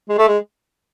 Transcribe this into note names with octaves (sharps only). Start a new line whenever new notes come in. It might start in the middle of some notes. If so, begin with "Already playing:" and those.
G#3
A3
G#3